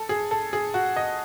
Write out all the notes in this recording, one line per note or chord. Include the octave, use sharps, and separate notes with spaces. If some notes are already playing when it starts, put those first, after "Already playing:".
Already playing: A4
G#4
A4
G#4
F#4
D#5